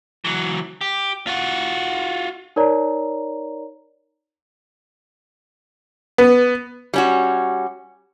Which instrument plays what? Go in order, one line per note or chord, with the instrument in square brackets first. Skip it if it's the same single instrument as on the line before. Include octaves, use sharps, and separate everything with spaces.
[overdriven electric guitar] E3 F#3
G4
F4 F#4
[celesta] D#4 A#4 C#5 D5 A#5
[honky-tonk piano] B3
[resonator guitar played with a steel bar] G3 C#4 F#4